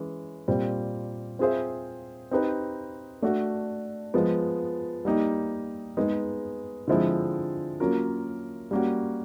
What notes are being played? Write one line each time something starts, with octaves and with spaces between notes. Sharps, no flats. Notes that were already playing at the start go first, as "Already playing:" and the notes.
Already playing: E3 G#3 C#4
A#2 G3 C4
C4 F4 G#4 C5 E5
C4 D#4 G4 B4
A3 D4 F#4
F3 G#3 B3
G3 A#3 D#4 G4
G#3 B3 D#4 G#4
D3 F3 G#3 C4 E4
F#3 A#3 C#4 F4 A#4
G3 A#3 C#4 F#4